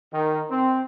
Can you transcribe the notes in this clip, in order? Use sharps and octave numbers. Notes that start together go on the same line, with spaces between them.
D#3
C4